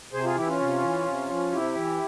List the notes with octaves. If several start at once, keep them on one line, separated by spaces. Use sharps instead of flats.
C3 G#4 C5
F4 G#4
E3 E4 G4
C#4 F4
C3
E3
C3
F3
C3 E4 G4
E3